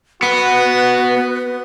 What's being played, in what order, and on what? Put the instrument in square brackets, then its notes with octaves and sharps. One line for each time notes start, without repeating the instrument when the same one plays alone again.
[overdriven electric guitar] B3 [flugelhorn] F#4 [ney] B4